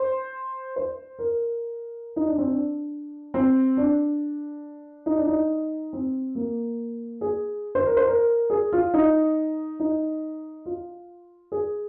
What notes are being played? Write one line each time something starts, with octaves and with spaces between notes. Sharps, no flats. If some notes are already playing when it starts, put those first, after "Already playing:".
Already playing: C5
C5
A#4
D#4
D4
C4
D4
C4
D4
D#4
D4
D#4
C4
A#3
G#4
C5
A#4
C5
A#4
G#4
F4
D#4
D#4
F4
G#4